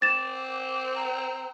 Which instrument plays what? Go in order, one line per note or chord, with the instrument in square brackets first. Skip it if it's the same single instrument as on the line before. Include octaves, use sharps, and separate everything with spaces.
[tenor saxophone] C4 [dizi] D6 [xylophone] A6 E7
[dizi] A#5